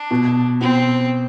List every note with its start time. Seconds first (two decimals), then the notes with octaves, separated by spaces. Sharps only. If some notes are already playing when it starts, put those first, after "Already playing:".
Already playing: D4
0.11 B2
0.61 B2 C4